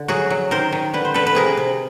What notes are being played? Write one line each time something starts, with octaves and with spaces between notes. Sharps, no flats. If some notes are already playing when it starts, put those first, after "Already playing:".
Already playing: D3
F#3 F#4 G#4
F#3
D#3 A#4 C5
D#3
D3 B4
C5
D3 A4 B4
B4
C3 G#4 A#4
C3